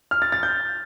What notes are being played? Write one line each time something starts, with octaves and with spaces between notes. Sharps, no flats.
F6
A6
A6
G6